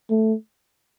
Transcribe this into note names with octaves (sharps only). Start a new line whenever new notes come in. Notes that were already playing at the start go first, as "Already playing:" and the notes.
A3